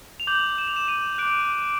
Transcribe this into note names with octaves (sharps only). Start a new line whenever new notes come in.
F7
D6 G6 F#7
E7
F7
E7
D#7
D6 F#6 D7